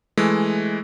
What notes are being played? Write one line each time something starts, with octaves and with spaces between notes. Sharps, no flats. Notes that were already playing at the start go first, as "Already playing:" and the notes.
E3 G#3 A3